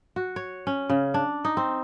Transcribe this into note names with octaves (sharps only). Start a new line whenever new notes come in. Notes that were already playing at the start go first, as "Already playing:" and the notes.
F#4
C#5
C#4
C#3
D4
D#4
C4